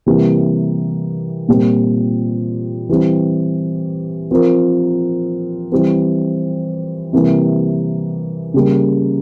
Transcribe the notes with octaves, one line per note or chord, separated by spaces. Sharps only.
C3 E3 G3 A#3
A#2 G3 C4
E3 G3 C4 G4
F3 C4 F4 A#4
E3 G3 C4
C3 E3 G3 A#3
C#3 G3 A#3